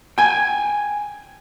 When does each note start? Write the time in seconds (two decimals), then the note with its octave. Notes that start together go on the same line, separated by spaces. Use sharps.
0.18 G5 G#5